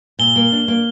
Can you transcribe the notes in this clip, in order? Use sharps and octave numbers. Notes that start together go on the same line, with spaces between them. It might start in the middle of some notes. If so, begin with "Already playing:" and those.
A#2 G7
A#3
D4
A#3